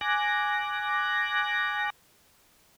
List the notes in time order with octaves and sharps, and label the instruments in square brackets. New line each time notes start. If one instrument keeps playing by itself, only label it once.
[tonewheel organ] G#5 D6 F#6 A#6